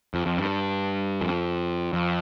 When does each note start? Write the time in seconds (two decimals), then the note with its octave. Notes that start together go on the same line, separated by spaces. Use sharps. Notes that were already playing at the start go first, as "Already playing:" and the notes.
0.14 F2
0.26 F2
0.38 G2
1.21 F2
1.93 F2